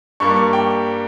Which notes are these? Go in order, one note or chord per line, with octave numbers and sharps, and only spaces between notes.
G2 G3 A#3 C#6
C#6
G5